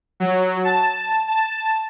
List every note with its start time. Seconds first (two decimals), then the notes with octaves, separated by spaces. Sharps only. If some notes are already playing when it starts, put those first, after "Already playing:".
0.20 F#3
0.65 A5
1.28 A5